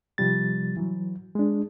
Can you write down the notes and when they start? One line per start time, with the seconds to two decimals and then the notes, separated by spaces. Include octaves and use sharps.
0.18 C3 F3 G3 A6
0.77 E3 F#3
1.35 G#3 D4